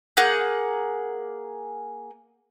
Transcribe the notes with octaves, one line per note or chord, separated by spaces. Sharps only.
A#3 G#4 F#5 G6